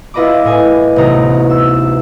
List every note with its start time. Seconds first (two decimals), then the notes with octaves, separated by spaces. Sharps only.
0.14 E4 F4 B4 D#5 B5 D6
0.44 A2 D#5 G#5
0.96 A1 D2 C3 B3 D#4 A#5
1.50 E6